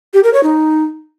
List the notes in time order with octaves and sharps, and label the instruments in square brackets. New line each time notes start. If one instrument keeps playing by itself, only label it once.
[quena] G4
A#4
C#5
D#4